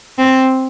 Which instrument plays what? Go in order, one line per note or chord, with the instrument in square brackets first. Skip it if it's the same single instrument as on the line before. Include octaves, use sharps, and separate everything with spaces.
[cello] C4